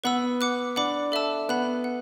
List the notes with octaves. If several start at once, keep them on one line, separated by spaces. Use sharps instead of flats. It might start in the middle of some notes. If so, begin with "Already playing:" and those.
B3 B4 F#5 B5 E6
F#5 D6 F#6
D4 F#5 B5 D6
A4 E5 A5 E6
B3 F#5 B5 F#6
F#5